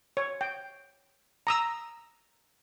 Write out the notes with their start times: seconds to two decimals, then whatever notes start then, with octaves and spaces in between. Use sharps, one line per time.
0.17 C#5
0.41 G5
1.47 A#5 D#6 E6